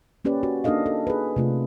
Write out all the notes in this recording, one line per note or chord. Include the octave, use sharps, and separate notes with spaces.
A#3 C#4 G4 B4 D5
F#4
A#3 D4 D#4 A4 D#5 F5
A4
G#4 B4
C3 A3 F4